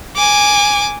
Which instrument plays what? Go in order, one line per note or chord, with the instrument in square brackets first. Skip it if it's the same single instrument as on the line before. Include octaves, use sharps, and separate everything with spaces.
[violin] G#5 D6